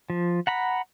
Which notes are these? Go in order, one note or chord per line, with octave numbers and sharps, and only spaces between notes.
F3
F#5 A#5 B5